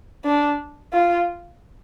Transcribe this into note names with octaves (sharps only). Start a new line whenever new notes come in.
D4
F4